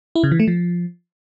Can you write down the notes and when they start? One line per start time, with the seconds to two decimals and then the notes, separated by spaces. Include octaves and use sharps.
0.15 E4
0.24 C#3
0.32 E3
0.40 A3
0.48 F3